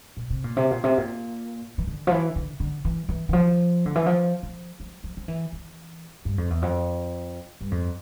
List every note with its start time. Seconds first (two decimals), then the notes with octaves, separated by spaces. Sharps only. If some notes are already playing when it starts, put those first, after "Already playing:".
0.17 A#2
0.30 C3
0.44 A#2
0.57 C3
0.71 A#2
0.84 C3
0.98 A#2
1.78 E3
1.87 D3
2.07 F3
2.12 E3
2.36 D3
2.60 D3
2.85 E3
3.09 E3
3.29 E3
3.33 F3
3.86 D3
3.95 E3
4.06 F3
4.43 F3
4.80 F3
5.04 F3
5.17 F3
5.28 E3
5.52 E3
6.25 G2
6.38 F2
6.50 E2
6.62 F2
7.61 G2
7.71 F2